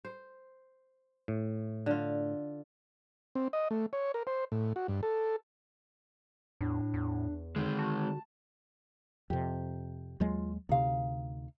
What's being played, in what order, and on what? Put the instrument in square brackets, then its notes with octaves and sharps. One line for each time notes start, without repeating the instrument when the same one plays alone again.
[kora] C5
[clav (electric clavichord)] A2
[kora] D3 F4
[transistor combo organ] C4
D#5
A3
C#5
A#4
C5
A2
F#4
G2
A4
[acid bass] E2 [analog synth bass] A2 [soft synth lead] D4
[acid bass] E2
[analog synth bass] D3 [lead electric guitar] D#3 G#3
[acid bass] F#4 [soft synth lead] A5
[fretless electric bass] F2 C3 [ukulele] G4
[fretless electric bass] D#2 F#3 G#3 [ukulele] F4
[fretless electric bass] D2 C3 [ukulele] D#4 F5